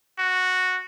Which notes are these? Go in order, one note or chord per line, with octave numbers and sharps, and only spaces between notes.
F#4